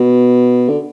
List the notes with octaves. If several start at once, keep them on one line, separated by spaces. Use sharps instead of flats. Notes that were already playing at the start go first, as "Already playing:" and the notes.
Already playing: B2
D3